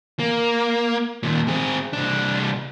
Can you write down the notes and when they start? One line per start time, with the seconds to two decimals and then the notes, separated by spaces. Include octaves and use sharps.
0.19 A#3
1.23 D#2 A#2
1.48 C4 G#4
1.93 C2 D4